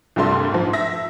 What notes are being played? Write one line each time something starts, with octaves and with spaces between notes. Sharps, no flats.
C2 G2 G3 A3 C6
G#2 F3
E5 A#6